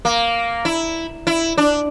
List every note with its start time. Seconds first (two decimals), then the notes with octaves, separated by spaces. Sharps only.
0.05 A#3
0.65 E4
1.27 E4
1.58 D4